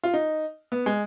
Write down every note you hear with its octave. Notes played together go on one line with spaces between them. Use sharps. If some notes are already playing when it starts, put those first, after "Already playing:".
F4
D#4
B3
G#3